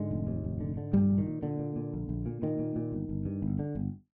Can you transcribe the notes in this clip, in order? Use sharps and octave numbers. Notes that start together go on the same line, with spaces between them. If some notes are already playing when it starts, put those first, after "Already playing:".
Already playing: G#2 D3 G#3
F1
D#2
F1
D3
D3
A#1 G2 G3
A#1
D#3
A#2
A#2 D3
A#2
A#2
A#1
A#1
A#2
A#2 D#3
A#2
A#2
G1
G1
G2
G1
D3
G1